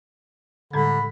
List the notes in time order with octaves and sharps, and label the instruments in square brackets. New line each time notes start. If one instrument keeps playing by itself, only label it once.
[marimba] A2 G3 G#3 [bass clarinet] D3 [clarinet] B5